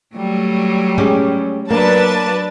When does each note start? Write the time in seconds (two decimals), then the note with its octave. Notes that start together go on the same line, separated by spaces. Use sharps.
0.15 F#3 G3 A3
0.98 G#3 C#4 G4
1.70 F#3 A#3 D4 B4 A5